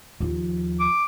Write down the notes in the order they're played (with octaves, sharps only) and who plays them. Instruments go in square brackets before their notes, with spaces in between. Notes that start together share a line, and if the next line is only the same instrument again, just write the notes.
[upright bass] D#2 F3
[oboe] D6